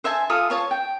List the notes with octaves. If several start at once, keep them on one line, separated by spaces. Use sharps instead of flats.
C5 E5 G#5 A5
F4 A4 F5 D#6
F4 C#5 A5
G5